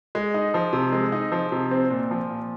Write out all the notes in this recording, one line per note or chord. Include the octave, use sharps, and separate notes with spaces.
G#3
D#4
F3
C3
G#3
D#4
F3
C3
C4
A#2
F3
A#2